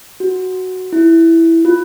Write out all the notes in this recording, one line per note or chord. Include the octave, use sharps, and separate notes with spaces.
F#4
E4
F4